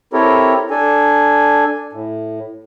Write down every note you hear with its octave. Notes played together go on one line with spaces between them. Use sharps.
C4 E4 G4 A4 A#4 C#5
D4 A4 G#5
A2